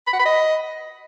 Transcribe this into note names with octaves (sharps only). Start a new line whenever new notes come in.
B5
F#5
B5
D#5